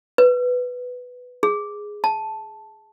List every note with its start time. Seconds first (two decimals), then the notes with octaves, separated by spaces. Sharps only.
0.18 B4
1.43 G#4
2.04 A5